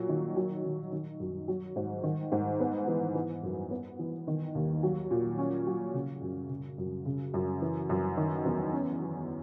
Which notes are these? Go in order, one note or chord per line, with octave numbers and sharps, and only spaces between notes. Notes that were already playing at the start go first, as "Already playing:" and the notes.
Already playing: A#2 F#3
D#3
F#3
D#3
D#3
F#2
F#3
G#2
D#3
G#2
B3
E3
E3
F#2
B3
E3
D#3
D#2
F#3
A#2
C#4
F#3
C#3
F#2
C#3
F#2
C#3
F#2
E3
F#2
D#3
E2
C#4
F#3